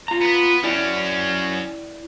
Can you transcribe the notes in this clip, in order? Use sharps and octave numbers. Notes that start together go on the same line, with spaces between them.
F4 A#5
B3 B4
F#3 C#4 E4 D5 G5